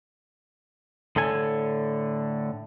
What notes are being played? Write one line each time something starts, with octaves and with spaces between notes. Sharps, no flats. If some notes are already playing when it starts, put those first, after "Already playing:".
A2 D3 A4 G#5